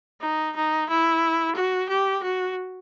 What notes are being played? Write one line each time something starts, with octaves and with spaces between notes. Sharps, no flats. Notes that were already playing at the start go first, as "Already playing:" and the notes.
D#4
D#4
E4
F#4
G4
F#4